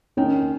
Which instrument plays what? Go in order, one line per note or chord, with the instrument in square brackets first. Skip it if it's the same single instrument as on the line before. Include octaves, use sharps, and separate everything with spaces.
[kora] D#3 [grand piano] C#4